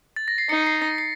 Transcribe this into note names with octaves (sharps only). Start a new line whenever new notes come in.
A6
A#6
C7
D#4 C#7
C7
A#6
C7